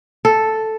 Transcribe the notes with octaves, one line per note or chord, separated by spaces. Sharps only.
A4